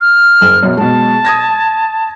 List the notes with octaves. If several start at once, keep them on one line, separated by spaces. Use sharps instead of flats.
F6
F#1
F#2 B2
B2 G#3 A5
D#6 G#6 A#6